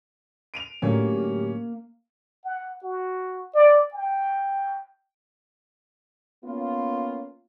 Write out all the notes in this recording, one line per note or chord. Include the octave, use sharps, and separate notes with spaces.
D7 D#7 F7
A2 D3 F#3 A#3 C#4 G4
F#5
F#4
D5
G5
A#3 B3 C#4 F4